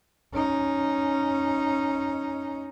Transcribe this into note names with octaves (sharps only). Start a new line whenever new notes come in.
C#4 D#4